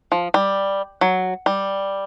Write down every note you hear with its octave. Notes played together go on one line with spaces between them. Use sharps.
F3
G3
F#3
G3